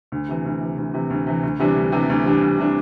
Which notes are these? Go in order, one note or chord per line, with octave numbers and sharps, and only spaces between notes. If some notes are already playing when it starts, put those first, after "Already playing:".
D2
C3 E3
D2
C3 E3
D2
C3 E3
D2
C3 E3
D2
C3 E3 G3 D4
D2
C3 E3 G3 D4
D2
C3 E3 G3 D4
D2
C3 E3 G3 D4